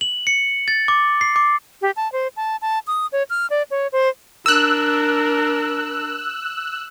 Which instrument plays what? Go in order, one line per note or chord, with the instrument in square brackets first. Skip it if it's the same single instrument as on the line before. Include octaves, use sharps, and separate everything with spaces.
[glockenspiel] F#7
C#7
A6
D6
C7
D6
[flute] G4
A5
C5
A5
A5
D#6
C#5
F6
D5
C#5
C5
[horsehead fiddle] D4 A#4 [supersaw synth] E6 F#6